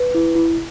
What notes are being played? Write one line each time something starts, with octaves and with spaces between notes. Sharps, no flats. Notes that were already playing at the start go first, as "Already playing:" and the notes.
Already playing: B4
E4
E4